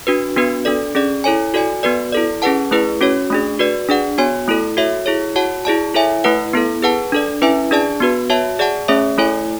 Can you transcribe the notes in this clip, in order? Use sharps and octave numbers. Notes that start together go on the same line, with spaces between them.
D4 F#4 B4
B3 D4 F#4 B4
D4 A4 D5
C#4 G#4 D5
E4 A4 C#5 G#5
F#4 A4 D5 G#5
B3 F#4 B4 D5
E4 A4 D5
C#4 G#4 B4 F#5 A5
A3 E4 G#4 B4
C#4 F#4 C#5
A3 D4 G#4
F#4 B4 D5
D4 G#4 D5 F#5
B3 F#4 C#5 G#5
A3 E4 A4
F#4 A4 C#5 E5
E4 G#4 C#5
F#4 C#5 F#5 A5
E4 G#4 D5 A5
E4 A4 C#5 E5 G#5
A3 E4 B4 F#5
B3 E4 A4
G#4 B4 F#5 A5
D4 A4 D5
C#4 E4 B4 E5 G#5
D4 G#4 D5 A5
B3 F#4 B4
F#4 C#5 E5 A5
G#4 D5 F#5 A5
A3 C#4 G#4 C#5 E5
A3 E4 A4 C#5 G#5